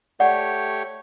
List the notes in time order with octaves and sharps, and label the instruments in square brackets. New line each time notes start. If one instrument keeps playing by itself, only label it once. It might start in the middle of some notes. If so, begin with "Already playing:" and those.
[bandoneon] A3 G4 C#5 [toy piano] D5 F#5